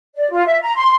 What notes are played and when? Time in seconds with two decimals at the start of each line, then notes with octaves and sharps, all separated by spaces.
0.16 D5
0.31 F4
0.46 E5
0.62 A#5
0.76 C6